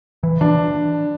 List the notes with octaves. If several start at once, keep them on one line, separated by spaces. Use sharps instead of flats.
E3 B4
E3 D4